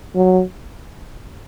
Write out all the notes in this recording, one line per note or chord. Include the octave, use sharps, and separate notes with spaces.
F#3